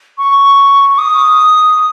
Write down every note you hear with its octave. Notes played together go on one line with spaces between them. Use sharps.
C#6
D#6